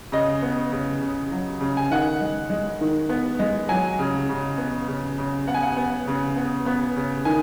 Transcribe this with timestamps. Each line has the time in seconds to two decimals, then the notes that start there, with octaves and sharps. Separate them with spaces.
0.12 C#3 D#5
0.42 B3
0.72 C#3
1.01 C#3
1.31 F#3
1.61 C#3
1.77 G#5
1.91 D#3 F#5
2.21 G#3
2.50 G#3
2.81 D#3
3.09 B3
3.39 G#3
3.69 F#3 G#5
3.99 C#3
4.29 C#3
4.58 B3
4.88 C#3
5.18 C#3
5.47 B3 F#5
5.54 G#5
5.63 F#5
5.77 B3
6.07 C#3
6.36 B3
6.66 B3
6.97 C#3
7.25 D#3 G#5